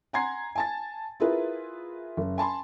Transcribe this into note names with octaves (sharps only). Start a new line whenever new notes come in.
F#5 G#5 A#5 C6 G#6 C7
G#5 A5 A6
E4 F4 G#4 A#4 B4 E5
F#1
G#5 A5 B5 C6